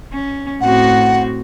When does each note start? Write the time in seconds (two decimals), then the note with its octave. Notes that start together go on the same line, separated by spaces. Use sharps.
0.13 C#4
0.61 A2 C4 F#4 F#5